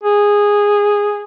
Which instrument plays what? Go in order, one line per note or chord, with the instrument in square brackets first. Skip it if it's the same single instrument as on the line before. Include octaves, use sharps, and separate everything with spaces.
[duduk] G#4